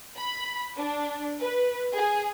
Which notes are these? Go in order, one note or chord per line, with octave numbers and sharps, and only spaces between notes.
B5
D4
B4
G#4